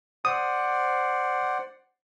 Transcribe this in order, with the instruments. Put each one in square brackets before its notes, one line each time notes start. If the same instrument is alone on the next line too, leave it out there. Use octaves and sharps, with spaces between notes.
[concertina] C5 D5 F#5 [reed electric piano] D#6